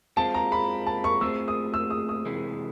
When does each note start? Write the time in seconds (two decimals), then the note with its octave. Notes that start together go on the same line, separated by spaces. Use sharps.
0.17 G#3 C4 F4 A5
0.34 A#5
0.52 B5
0.86 A5
1.04 C#6
1.21 A3 C4 F4 G#4 C5 E6
1.48 D#6
1.74 E6
1.90 D#6
2.09 D#6
2.26 C3 E3 G#3